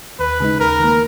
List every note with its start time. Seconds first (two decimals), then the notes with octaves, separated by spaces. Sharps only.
0.19 D#2 B4
0.40 C#3 G#3 D#4
0.60 D#2 A#4
0.80 D#3 A#3